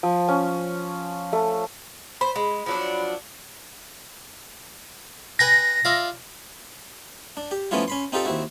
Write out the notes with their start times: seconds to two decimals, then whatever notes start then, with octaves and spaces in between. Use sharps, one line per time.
0.03 F3
0.28 C#4
1.33 A3
2.21 C5 B5
2.36 G#3
2.66 F3 F#3 D4
5.39 B4 G5 G#5 A#6
5.85 F4 D5 E5
7.37 D4
7.51 G4
7.71 F3 A3 B3 C#4 E4 F4
7.88 C#4 B5 C6
8.12 C4 D#4 F4 G4 A4 G5
8.25 D#2 C4 E4 F#4